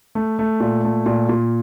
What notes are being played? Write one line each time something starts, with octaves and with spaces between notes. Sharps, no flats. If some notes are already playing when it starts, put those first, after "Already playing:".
A3
A3
A#2
A3
A#2
A#2